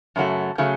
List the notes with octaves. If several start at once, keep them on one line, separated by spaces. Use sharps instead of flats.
F#2 C#3 F#3 A3
C#3 F#3 A3